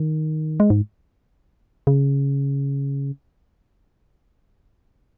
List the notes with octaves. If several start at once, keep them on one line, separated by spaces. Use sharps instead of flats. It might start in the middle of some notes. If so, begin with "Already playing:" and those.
Already playing: D#3
G#3
G#2
C#3